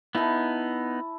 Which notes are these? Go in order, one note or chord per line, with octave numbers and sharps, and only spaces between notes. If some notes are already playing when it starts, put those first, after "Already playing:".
B3 D#4 E4 A5